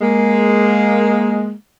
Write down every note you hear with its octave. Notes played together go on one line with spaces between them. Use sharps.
G#3 A#3